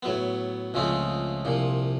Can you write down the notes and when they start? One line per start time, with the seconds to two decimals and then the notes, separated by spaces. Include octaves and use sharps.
0.03 A2 F#3 B3
0.74 C#2 C#3 F3 A3 C4
1.45 C2 A#2 F3